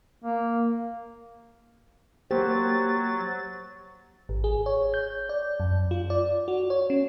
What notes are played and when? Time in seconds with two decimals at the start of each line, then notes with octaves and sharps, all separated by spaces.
0.24 A#3
2.31 F#3 A#3 G4 C5 A6
4.29 G#1
4.44 G#4
4.66 C#5
4.94 G6
5.29 D5
5.60 F#2
5.91 F4
6.10 D5
6.48 F#4
6.70 C#5
6.90 C#4